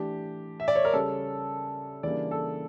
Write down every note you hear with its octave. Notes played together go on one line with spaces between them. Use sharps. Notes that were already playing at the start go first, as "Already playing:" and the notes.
Already playing: E3 A3 D4 G4
E5
D5
C#5
A#4
C#3 G3 C#4 A4
C#3 E3 G3 A#3 D4 D5
A4